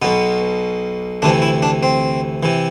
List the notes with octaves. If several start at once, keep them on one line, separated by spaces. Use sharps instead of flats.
B1 B2 B3
D2 C3 E3 D4
E4
D4
C4
C3 E3